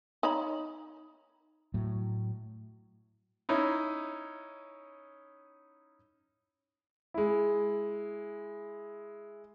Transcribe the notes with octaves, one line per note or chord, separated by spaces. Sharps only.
D#4 C#5 B5
A2 F#3
C#4 D#4 E4
G#3 E4